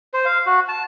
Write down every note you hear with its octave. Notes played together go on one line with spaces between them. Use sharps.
C5
F5
F#4
A5